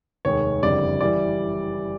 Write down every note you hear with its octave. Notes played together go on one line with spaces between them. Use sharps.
F1 D#2 D#3 G#3 C#5
F#1 F2 D3 G3 D5
E3 G3 D5